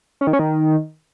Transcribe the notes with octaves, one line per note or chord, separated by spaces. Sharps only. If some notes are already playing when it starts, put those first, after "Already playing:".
C#4
D#3
C#4
D#3